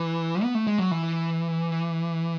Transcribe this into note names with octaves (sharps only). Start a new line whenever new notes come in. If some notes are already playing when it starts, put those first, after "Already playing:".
Already playing: E3
B3
A3
G#3
F#3
E3